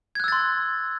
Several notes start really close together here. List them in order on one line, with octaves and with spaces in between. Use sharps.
G#6 F#6 E6 A6 C6